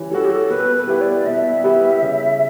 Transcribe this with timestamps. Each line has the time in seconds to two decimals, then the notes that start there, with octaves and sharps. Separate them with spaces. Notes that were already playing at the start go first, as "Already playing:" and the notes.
Already playing: E3 G3 C#4
0.11 G3 C#4 F#4 A4
0.24 G4
0.30 A4
0.50 B2 B4
0.75 B4
0.87 G3 B3 E4 G4
1.01 D5
1.26 B2 E5
1.64 G3 B3 E4 G4
2.01 C#3